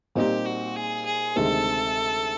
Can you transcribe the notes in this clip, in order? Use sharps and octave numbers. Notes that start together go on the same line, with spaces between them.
A#2 G3 C4 D#4 G4
F#4
G#4
G#4
D2 C3 D#3 G#3 C4 A4